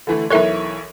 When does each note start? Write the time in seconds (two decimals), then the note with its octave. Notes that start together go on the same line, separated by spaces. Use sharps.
0.07 D3 E3 A3
0.30 B1 E3 A4 A#4 C#5 E5